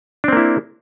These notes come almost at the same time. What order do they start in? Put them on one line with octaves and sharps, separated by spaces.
D4 C4 A#3 E4